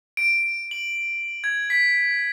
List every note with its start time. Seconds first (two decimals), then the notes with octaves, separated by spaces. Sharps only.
0.17 D7
0.71 F#7
1.44 G#6
1.70 B6